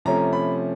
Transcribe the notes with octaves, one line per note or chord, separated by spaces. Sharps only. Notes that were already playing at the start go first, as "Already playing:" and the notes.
C3 F3 A3 C#4 A#5
B5